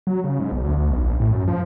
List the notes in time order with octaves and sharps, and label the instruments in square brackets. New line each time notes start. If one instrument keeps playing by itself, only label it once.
[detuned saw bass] F#3
C#3
G#2
B1
D2
D2
B1
A#1
A2
F#2
F3